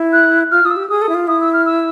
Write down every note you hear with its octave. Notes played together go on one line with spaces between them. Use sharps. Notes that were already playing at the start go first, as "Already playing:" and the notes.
Already playing: E4
F#6
F4 F6
F4 D#6
E6
G4
G#4 D#6
A4
E4
F4
E4 D#6
E6
F6
E6